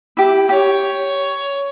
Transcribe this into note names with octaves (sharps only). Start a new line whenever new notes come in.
E4 G4
G4 C#5